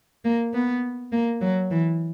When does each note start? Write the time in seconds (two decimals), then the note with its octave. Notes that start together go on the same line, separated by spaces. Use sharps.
0.25 A#3
0.54 B3
1.12 A#3
1.42 F#3
1.71 E3